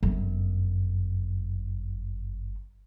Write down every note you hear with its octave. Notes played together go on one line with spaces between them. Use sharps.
G1 F#2